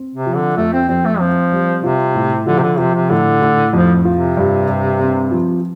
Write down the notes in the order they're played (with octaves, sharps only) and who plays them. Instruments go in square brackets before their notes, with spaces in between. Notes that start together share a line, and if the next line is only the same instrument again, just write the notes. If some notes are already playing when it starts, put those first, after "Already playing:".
Already playing: [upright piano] C4
[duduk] C3
[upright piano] F3
[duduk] D3
[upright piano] F2 [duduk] A3
[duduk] C4
[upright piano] F2 [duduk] C4
[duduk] A3
[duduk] F3 [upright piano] C4
[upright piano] G3
[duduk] C3 [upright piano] F4
[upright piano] A2
[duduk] D3 [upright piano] F3
[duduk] C3
D3
[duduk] C3 [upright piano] F3
[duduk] C3
[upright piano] A2 [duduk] D3
[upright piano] A2
[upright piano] F2 [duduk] F3
[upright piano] F4
[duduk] C3
[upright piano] G2
G2
C4
F3